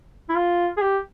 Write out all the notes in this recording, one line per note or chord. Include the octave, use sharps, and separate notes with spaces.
E4
F4
G#4
G4